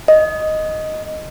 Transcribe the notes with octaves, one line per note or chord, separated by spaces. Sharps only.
D#5